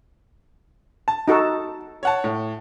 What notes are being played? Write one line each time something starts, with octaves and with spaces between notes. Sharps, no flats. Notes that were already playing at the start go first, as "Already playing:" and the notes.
A5
D#4 F#4 A4
C#5 F#5 A5
A2